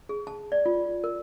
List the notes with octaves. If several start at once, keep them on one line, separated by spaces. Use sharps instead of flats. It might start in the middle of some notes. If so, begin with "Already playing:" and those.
G#4
A5
D5
F4
A#4